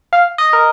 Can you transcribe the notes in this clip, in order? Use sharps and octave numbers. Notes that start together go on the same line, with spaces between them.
F5
D#5
A#4